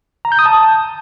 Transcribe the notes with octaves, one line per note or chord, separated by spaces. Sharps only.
A#5
G6
D#6
A5